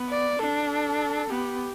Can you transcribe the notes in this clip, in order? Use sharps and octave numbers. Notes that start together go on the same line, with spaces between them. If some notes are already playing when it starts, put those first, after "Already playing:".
Already playing: B3
D5
D4 A4
A4
B3 G4